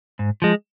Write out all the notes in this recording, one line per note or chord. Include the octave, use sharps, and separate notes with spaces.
G#2
F3 G#3